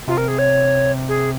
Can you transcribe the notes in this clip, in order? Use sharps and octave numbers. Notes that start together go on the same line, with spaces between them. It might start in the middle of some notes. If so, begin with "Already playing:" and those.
C3 F4
A#4
G#4
C#5
G#4